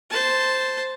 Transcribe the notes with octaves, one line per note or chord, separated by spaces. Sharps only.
C5 A5